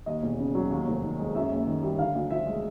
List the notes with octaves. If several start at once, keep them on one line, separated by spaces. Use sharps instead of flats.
D#2 D#5
E1
C#3
F#3
D#2
F1
D#3
G#3
F#2 E5
F#1
D#3
G3
D3 F5
D2
F3 E5
G#3